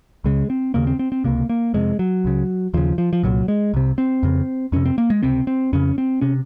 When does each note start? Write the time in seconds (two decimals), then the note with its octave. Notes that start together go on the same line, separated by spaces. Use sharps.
0.24 C#2 C#3 G#3
0.50 C4
0.74 D#2 C#3 A#3
0.87 C4
0.99 C4
1.12 C4
1.24 C#2 C3 A#3
1.49 A#3
1.74 F2 C3 G#3
1.99 F#3
2.25 C#2 C#3
2.74 D#2 C#3 F3
2.98 F3
3.13 F3
3.23 C2 A#2 F#3
3.48 G#3
3.74 C2 C3
3.98 C4
4.23 F2 C#3
4.72 F2 C3 C#4
4.86 C4
4.98 A#3
5.10 G#3
5.23 C#2 C3 C4
5.47 C4
5.73 F2 C#3 C#4
5.98 C4
6.21 C3 C#4